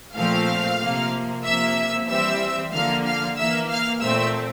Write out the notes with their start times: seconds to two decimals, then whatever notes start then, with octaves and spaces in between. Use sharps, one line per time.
0.16 A#2 F3 A3 C4 F5 F6
0.80 C3 F3 A#3
1.44 C3 F3 A#3 E5 E6
2.08 E3 G3 C4 E5 E6
2.72 D3 F3 A#3 F5 F6
3.06 F5 F6
3.37 E3 A#3 E5 E6
3.69 F5 F6
4.01 A#2 A3 C4 E5 E6